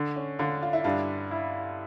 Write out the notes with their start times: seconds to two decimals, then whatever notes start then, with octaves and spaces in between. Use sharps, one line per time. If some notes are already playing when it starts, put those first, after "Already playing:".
Already playing: D3
0.16 C#4
0.39 D3 D4 F4
0.62 F4
0.73 E4
0.84 G2 D4 F4
1.31 E4